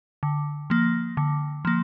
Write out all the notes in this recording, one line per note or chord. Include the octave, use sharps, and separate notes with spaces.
D3
F3 A#3
D3
F3 A#3